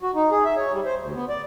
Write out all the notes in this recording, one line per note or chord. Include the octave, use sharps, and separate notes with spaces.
F#4
D#4
G#4
E5
C#5
G3
C5
D2
B3
D5